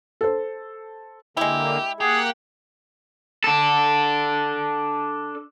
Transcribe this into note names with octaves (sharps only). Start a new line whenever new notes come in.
A4 C5
D3 G#3 A#3 E4 G4
A#3 G4 G#4 F#5
D4 A4